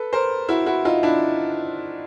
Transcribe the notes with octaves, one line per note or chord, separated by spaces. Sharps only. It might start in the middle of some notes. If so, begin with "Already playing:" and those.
Already playing: A4 B4
A#4 C5
E4 F#4
E4 F#4
D#4 F4
D4 E4